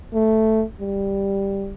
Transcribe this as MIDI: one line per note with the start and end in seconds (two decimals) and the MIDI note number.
0.14 0.64 57
0.81 1.73 55